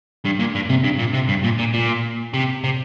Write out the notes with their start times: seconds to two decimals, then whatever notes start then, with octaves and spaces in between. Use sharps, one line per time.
0.25 G2
0.39 A#2
0.55 G2
0.69 C3
0.84 G2
0.99 A#2
1.14 C3
1.29 G2
1.44 A#2
1.59 A#2
1.74 A#2
2.34 C3
2.64 C3